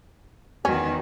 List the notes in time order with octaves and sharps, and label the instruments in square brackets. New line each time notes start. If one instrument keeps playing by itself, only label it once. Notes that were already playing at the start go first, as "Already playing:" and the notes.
[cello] E2 D#3 [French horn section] B3 D#4 F#4 [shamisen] C#4